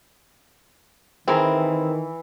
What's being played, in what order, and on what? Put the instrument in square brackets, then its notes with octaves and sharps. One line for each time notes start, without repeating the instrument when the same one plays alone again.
[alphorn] D#3 [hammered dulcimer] E3 [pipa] C4 [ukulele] G#4 A#4